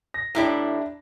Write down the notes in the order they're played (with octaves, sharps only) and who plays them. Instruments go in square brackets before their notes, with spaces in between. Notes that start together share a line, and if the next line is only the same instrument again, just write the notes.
[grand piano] A#6
[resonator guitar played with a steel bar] A2 E4 G4 [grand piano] D4 E5 A#5